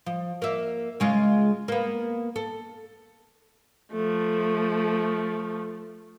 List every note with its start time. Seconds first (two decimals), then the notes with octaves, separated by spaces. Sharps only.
0.06 F3
0.42 A#3 E5
1.00 C#3 G#3 F4
1.68 A#3 B3
2.36 A4
3.92 F3 A3